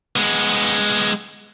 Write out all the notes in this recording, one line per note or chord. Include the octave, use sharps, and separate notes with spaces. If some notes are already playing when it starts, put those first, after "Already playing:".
G#3 B3